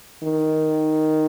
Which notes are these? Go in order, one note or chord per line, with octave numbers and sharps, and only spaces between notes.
D#3